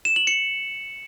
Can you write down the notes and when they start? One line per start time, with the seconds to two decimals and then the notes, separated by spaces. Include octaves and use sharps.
0.05 E7
0.16 F#7
0.27 C#7